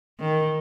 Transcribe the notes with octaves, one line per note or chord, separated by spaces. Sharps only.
D#3